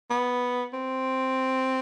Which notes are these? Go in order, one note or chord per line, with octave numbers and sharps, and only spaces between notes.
B3
C4